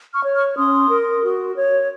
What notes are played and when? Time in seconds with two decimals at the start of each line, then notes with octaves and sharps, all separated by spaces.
0.14 C#6 F6
0.24 C#5
0.35 C#6 F6
0.57 C#4 C6 D#6
0.90 A#4
1.22 F#4
1.56 C#5